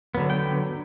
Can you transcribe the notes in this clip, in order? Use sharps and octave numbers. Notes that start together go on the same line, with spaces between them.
D3 F#3 B3
G5